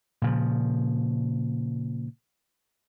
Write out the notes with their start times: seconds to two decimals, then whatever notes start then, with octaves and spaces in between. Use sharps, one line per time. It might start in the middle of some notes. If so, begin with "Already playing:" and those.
0.22 A#2 C#3 F3